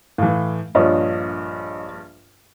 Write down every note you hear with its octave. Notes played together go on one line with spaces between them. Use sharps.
A2 E3 F5
A#1 G2 F4 C#5 D#5